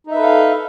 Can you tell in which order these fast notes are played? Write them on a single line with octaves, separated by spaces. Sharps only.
D#4 E5 B4 A4 F5